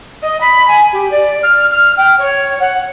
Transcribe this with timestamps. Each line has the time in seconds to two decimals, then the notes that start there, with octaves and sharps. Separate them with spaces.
0.22 D#5
0.40 B5
0.67 G#5
0.92 G4
1.11 D5
1.42 F6
1.70 F6
1.97 G5
2.18 C#5
2.60 F#5